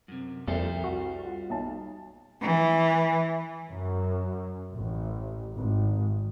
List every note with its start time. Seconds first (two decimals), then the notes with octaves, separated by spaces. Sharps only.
0.08 F#2 C3
0.47 C2 F2 G3 A4 C5
0.84 F#4
1.23 F4 F#5
1.50 B1 A5
2.41 E3
3.69 F#2
4.73 A1
5.56 G#1